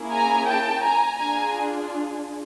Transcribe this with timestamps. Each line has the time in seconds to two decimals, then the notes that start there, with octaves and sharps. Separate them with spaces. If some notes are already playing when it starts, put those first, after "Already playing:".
Already playing: A#3 C#4 E4 G#4
0.12 G#5 A#5
0.48 G5 A5
0.83 G#5 A#5
1.18 D4 F4 G#4 G#5 A#5